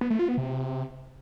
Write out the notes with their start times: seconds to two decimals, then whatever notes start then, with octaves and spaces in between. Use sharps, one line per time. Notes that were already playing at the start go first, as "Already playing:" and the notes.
0.01 B3
0.10 A3
0.19 F4
0.28 B3
0.37 C3